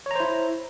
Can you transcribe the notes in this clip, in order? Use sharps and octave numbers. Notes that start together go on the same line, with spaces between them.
E4 C5 C#5 A#5